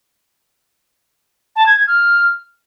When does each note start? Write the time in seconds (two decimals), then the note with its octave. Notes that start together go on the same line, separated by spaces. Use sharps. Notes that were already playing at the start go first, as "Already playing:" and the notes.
1.56 A5
1.66 G#6
1.77 G#6
1.87 F6